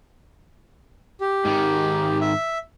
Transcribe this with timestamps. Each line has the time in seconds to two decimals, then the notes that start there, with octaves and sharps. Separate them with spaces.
1.21 G4
1.45 G#2 D#3
2.21 E5